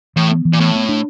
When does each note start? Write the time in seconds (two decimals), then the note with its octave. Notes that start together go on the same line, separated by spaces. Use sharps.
0.16 A2 E3
0.31 B3
0.45 E3
0.53 A#2
0.60 A2 B3
0.75 B3
0.89 D4